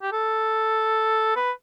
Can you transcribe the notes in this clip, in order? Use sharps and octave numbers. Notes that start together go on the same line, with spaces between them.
G4
A4
B4